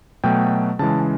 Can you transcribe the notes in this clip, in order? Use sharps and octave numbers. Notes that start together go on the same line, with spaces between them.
B2 F#3 A3 G5
C#3 E3 G#3 A5